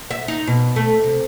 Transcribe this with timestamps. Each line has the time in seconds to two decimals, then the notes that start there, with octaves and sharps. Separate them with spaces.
0.11 E5
0.28 D#4
0.47 B2
0.76 A3
1.04 C3